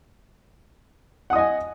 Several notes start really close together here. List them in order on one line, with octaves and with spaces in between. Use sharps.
F#5 D#6 D#5 G#5